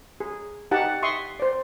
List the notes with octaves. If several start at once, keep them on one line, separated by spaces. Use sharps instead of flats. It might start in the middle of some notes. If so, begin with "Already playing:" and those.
G#4
D#4 G4 F#5 A5
E5 C6 C#6 D#6
C5 D5